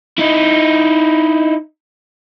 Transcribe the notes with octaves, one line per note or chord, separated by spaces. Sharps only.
D#4 E4